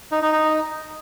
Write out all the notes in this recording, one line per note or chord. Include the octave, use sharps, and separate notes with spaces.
D#4
D#4
D#4